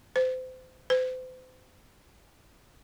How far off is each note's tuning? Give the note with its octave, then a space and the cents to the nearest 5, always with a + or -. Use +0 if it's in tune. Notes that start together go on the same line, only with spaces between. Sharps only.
C5 -30
C5 -40